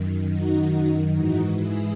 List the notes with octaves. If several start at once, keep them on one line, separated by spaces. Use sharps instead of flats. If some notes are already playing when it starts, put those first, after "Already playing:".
Already playing: F#2 D#3
D#4 F#4
G#2 E3 D#4 F#4
E4 G#4